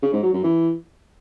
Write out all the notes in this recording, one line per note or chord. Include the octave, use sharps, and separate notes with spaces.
C#3
G#2
F#3
F#2
E3